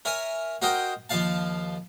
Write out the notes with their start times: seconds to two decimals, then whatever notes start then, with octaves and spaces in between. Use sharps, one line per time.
0.05 A#4 C#5 E5 G#5
0.62 F#4 A#4 C5 D#5 G5
1.10 D#2 F3 F5 A5